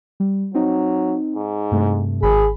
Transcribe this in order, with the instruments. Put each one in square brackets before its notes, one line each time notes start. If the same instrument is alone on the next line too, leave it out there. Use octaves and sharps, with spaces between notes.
[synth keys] G3
[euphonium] F#3 [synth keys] C4 D#4
[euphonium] G#2
[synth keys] G2 C3 A3
[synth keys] G#1 B5 [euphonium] G#4